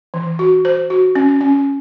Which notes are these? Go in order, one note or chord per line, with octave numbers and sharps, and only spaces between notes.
E3
F#4
C5
F#4
C#4
C#4